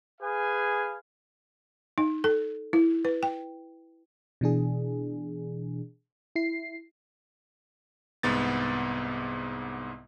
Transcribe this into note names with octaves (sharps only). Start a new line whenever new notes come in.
G#4 B4 F5 G#5
D#4
A4
E4
B4
G5
B2 E3 D4 G#4
E4 C7
C2 G#2 B3 A6